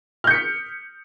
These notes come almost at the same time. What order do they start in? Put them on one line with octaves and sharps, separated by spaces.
F6 G6 C#7 B6